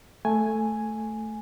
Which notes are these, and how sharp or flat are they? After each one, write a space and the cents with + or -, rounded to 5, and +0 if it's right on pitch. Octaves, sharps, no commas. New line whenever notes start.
A3 +0 G#5 +0